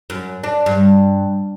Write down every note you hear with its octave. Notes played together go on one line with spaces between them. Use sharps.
F#2
D4
G2